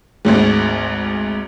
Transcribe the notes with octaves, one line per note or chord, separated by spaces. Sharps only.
G#1 D2 G#2